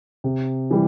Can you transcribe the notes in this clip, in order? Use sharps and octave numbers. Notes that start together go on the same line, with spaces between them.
C3
E3 G3